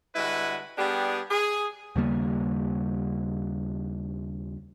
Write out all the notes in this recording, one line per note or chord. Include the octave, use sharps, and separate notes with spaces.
D3 G3 G#3 E4 F#4 B4
G3 B3 D4 G4 G#4
G#4
D#2 C#3 G3 A#3